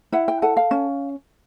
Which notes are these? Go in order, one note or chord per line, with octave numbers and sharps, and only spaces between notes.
E4 F#5
G5
A4 F#5
F5
C#4